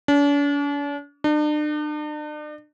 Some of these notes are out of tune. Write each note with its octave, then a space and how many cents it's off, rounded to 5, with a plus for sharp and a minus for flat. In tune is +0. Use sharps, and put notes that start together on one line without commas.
D4 -45
D4 +40